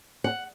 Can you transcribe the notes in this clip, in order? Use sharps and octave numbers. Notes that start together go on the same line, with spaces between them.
F#5